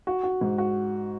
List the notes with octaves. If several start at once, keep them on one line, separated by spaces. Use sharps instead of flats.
F#4
F#4
G#2
F#4